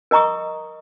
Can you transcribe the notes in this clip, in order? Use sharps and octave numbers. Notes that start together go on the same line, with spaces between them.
A#4 D#5 A#5 C#6 D#6